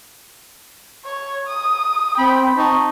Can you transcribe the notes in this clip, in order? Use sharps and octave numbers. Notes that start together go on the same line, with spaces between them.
C#5
D#6
C4 G5 B5
D#4 A5 C#6